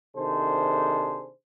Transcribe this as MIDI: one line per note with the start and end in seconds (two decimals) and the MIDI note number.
0.17 1.30 48
0.17 1.30 51
0.17 1.30 62
0.17 1.30 68
0.17 1.30 69
0.17 1.30 72